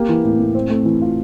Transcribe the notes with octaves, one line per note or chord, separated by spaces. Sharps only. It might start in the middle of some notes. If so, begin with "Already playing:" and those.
Already playing: A#3 G4
E3
A2
A2
C4
A3
E3
F4